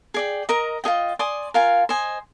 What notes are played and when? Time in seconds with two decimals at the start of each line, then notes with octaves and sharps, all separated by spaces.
0.14 G#4 D5 G5
0.49 A#4 D#5 A#5
0.84 F4 G#4 D#5 G5
1.19 D5 G#5 C6 D#6
1.54 F4 A#4 F5 G#5
1.89 C5 D#5 G#5